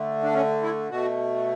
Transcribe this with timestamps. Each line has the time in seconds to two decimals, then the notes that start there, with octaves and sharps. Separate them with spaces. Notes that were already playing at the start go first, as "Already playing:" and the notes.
Already playing: D3 A3
0.23 D4
0.33 C#4
0.62 E4
0.89 B2 A3 F#4